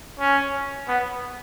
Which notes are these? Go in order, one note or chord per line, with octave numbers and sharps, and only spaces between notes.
C#4
B3